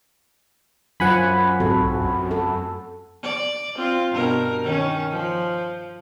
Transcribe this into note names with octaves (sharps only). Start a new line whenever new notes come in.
F#2 F#3 F4 C5 F#5 G#5 B5
G#2 C4 F#4 A4
B1
F#2
A4
D5
C4 F4
G2 B2 A#4
D#3 C#4
F3